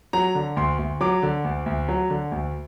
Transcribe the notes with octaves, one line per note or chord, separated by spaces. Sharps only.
F#3 A#5
D3
D2 C6
D2
F#3 D6
D3
D2
D2
F#3
D3
D2